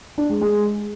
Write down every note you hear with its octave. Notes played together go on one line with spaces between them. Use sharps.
D4
G#3
G#3